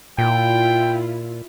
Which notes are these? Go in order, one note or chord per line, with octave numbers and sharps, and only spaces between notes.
A#2 E4 F4 G5